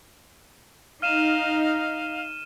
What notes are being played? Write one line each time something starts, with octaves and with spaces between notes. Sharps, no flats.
D#4 F5 F6 D#7 E7